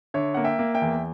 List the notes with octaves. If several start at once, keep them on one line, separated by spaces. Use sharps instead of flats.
D3 C#5 E5
A#3 F#5
E5 G5
A#3
E5 G5
E2